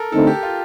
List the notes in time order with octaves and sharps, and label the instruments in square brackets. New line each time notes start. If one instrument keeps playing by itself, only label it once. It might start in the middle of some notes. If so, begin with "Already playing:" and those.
Already playing: [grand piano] A4 A#4
[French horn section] D3 A3 C4 D#4 [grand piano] A4
[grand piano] G4
F4